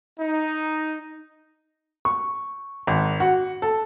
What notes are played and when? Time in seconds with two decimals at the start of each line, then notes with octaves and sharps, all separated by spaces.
0.20 D#4
2.05 C#6
2.87 G#1
3.20 F#4
3.62 A4